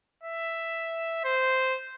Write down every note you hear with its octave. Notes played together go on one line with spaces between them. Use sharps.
E5
C5